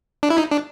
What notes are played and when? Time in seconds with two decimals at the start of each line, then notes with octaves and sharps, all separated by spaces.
0.23 D4
0.30 E4
0.38 D#4
0.51 D4